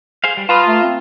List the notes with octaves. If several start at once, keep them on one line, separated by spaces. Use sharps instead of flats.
G#4 C5 F5
G3
F4 B4 A5 A#5 D#6
A3
C4